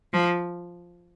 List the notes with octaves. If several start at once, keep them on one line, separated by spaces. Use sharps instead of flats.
F3